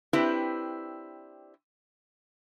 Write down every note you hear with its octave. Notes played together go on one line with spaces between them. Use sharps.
C4 D4 E4 G4 B4